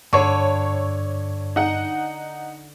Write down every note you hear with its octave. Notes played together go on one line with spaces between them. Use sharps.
G2 D3 C#5 C#6
D#4 F#5